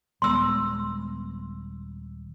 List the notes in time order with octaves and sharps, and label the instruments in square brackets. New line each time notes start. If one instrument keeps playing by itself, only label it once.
[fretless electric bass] D#1 G#3 B3 [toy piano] C6 E6